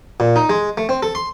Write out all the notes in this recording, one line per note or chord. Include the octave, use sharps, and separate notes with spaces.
A#2
D#4
G#3
A3
C4
A4
C6